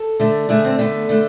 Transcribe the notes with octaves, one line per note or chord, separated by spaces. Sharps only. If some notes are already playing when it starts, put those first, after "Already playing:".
Already playing: A4
D3 A3
D3 A3 G#4
C4
D3 A3 B3
D3 A3